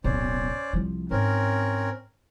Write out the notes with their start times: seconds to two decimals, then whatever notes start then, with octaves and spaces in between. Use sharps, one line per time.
0.04 D1 B1 C#4 C5 D5
0.73 C2 F3
1.11 G#2 C4 C#4 A#4